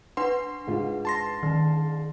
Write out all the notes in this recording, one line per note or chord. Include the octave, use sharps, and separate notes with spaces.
D4 B4 F#5 C6
G#2 F4
A5 C6 A#6
D#3